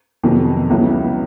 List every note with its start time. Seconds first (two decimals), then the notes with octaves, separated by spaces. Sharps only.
0.23 F2 C3 D#3 F#3 B3
0.70 C#2 C#3 F#3 B3 E4